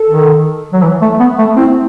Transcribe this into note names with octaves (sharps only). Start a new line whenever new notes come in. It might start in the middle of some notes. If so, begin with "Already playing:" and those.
Already playing: A4
D#3
F#3
E3
A3
B3
A3
C4 E4